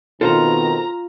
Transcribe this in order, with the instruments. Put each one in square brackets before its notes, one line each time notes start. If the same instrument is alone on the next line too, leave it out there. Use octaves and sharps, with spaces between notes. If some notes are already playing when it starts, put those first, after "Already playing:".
[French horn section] B2 D#3 C4 [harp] F4 [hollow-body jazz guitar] A4 C5 [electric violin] A#5